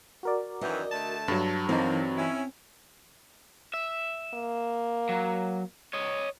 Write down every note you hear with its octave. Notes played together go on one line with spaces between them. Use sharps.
F#4 A#4 D5
F#2 D#3 E3 D#5
D3 A3 A5
G2 F#3 A4
E3 F3 A#3 C4 D#4
C#4 E4
E5
A#3
F#3
C#5 D#5